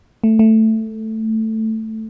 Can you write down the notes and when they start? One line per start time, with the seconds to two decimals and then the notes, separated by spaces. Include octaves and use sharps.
0.24 A3
0.39 A3